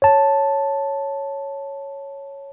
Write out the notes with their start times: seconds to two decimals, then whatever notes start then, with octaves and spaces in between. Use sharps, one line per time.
0.02 C#5 A5